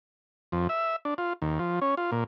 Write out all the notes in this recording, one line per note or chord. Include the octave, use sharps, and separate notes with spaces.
F2
E5
D4
F4
D#2
F3
C#4
F4
A#2